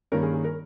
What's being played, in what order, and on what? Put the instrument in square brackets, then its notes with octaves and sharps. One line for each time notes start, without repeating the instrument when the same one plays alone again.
[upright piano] G2 D#3 A#3 C#4 A#4
G#4
G#4
A#4